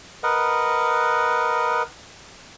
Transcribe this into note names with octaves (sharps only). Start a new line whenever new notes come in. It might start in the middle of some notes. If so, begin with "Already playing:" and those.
A#4 B4 D#5 F#5